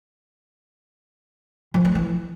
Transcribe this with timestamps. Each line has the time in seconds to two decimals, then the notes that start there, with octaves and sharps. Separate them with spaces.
1.74 F3
1.85 A3
1.95 E3